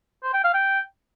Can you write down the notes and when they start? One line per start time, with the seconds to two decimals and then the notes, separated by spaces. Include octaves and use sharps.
0.23 C5
0.34 G5
0.44 F5
0.54 G5